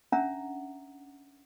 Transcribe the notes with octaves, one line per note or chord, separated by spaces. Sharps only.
C#4 D4 E5 F#5 A#5